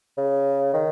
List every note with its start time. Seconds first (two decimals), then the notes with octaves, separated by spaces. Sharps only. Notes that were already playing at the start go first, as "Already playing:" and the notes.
0.17 C#3
0.73 D#3